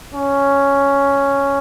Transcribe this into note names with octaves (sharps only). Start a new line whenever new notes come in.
C#4